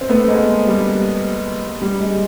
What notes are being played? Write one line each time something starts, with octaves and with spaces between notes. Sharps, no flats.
C4
A3 B3
G#3 A#3
G3
G3
G#3